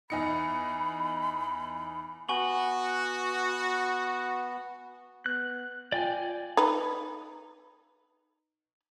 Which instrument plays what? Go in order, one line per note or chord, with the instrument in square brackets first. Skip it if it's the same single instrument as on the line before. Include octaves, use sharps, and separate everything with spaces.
[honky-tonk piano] E2 D#4 C#7 [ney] B5
[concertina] B3 [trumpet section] F#4 [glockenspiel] G#5 C#6 F#7
[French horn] B3 [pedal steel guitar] F#6
[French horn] F4 [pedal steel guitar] D5 G5 G#5
[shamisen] D#4 B4